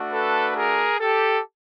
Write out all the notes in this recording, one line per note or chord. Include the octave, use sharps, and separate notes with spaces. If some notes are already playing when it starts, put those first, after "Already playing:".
Already playing: A3 D4 F#4
A4 B4
G#4 A#4
G4 A4